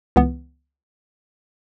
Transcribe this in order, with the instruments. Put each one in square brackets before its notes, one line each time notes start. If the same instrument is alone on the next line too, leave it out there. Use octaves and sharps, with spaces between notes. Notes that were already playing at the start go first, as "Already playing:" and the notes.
[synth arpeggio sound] C#2 E3 B3